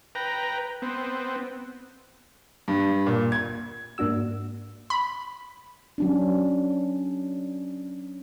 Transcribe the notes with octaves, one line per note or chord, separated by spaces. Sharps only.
B4 G5 A#5
B3 C4
G2
A#2
G#6
G#2 A#3 D4 F#4 E6
B5
F#3 C#4 D4